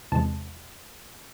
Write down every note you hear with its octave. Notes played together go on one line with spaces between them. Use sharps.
E2 C3 E3 G#3 A5